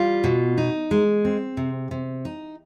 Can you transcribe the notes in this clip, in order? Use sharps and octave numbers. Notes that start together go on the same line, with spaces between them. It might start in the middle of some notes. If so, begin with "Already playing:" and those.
Already playing: G3 F4
B2
D#4
G#3
C4
C3
C3
D#4